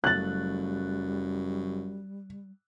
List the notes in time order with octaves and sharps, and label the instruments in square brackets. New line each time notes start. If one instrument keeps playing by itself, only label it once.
[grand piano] F#1 A3 F#7 [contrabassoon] F#2 [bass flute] G3 [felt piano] F#6 A6